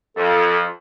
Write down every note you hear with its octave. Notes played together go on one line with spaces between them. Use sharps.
F2 A4